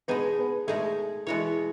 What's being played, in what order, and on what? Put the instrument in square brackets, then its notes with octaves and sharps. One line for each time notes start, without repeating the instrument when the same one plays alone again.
[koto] B2 G#3 D#4 G#4 [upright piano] B3
[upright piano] B3
[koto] B2 G#3 D#4 G#4 [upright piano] A3
[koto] B2 G#3 B3 F#4 C#5 [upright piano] E3